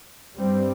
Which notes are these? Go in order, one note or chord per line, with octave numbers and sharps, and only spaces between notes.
G2 G3 C4